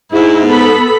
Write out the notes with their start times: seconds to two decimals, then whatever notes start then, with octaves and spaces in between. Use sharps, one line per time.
0.12 G#2 E4
0.49 B3 A4 B5